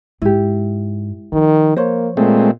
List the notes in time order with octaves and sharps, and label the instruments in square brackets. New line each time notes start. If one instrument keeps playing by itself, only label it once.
[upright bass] G#2 [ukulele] E4 G4
[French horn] D#3 [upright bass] F3
[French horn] A#3 [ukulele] C5 C#5
[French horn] A#2 [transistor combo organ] G#3 A3 C4